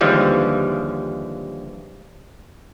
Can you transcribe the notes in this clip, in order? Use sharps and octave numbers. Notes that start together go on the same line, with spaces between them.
D#2 D3 E3 F3 G3 G#3